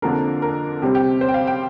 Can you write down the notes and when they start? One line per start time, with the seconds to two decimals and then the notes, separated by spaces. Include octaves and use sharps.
0.02 F2 D3 F3 A#3 D4 A#4
0.42 A#4
0.82 C3 G3 C4 G4
0.95 G4
1.21 C5
1.29 G5
1.34 F5
1.47 G5